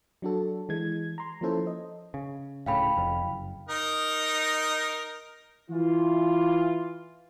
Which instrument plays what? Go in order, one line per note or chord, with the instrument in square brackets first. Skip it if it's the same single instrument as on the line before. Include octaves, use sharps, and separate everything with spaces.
[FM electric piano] F#3 D4 F#4 A4
E3 G#3 G#6
A#5 C6
F3 A#3 C#4 E4 A4 C5
D#5
[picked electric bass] C#3
[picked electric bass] D1 A2 C#3 [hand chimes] F5 G5 B5
[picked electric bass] F1 F2
F#1
[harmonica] D#4 A#4
[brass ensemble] E3 F4